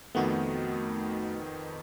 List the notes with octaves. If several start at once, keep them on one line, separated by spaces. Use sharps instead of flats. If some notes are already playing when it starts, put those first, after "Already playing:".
F2 D#3 A3 B3 F#4